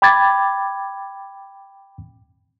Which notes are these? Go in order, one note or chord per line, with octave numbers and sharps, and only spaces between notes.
G5 B5 D6 G#6 A6